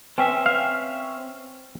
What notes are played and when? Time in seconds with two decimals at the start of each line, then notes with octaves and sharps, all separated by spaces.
0.18 C4 C#4 B4 E5 G5 G#5
0.46 F5